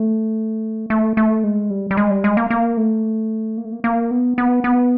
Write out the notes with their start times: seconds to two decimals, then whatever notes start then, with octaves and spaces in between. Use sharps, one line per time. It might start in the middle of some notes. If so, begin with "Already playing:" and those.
Already playing: A3
0.90 A3
1.17 A3
1.44 G#3
1.70 G3
1.91 G3
1.97 G#3
2.10 G3
2.24 G#3
2.37 A#3
2.50 A#3
2.77 A3
3.57 A#3
3.65 A3
3.72 A#3
3.84 A#3
4.11 B3
4.38 B3
4.64 B3